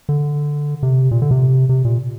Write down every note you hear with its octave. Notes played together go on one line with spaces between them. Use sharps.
D3
C3
A#2
D3
C3
C3
A#2